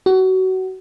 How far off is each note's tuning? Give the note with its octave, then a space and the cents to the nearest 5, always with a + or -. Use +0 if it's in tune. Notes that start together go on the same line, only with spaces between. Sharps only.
F#4 +25